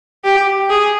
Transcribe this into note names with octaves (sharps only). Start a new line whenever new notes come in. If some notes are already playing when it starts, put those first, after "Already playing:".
G4
G#4